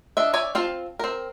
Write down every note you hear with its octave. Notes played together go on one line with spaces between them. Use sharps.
D4 D#5 E5
C#5 D5 E5 G#5
C4 F4 F5 A5
C4 A#4